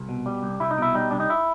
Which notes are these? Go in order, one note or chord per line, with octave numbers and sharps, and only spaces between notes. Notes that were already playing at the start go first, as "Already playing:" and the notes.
Already playing: C2
B2
G3
C2
C2 E4
D#4
B2 E4
G3 D#4
C2 D4
D#4
E4